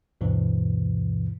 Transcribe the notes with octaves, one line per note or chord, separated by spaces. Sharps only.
D2 G2 B2 E3